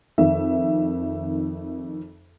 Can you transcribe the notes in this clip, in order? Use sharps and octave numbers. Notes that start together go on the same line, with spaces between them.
F2 D#3 E5